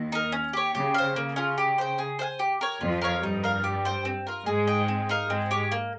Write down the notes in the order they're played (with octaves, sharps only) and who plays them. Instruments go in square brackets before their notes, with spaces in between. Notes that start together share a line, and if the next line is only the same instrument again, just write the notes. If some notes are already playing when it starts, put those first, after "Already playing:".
Already playing: [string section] D#2 D#3
[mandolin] D#4 A#4
C#4
G4 C#5
[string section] C#3 [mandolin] G4
[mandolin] C5 F5
[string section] C#3 [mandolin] A#3
[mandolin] C#4 F4
G4
C5 G5
G#4
C5 F5 G#5
G4
A#4 C#5
[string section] F2 F3 [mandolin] F4
[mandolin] A#4 C#5 F5
[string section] G2 G3 [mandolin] D#4
[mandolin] A#4 F5
G4
C5 G5
C4
F4 A#4
[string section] G#2 G#3 [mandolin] G#4
[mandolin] D#5 G5
C4
D#4 A#4 F5
[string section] G#2 G#3 [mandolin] C4
[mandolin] G4 C#5
A#3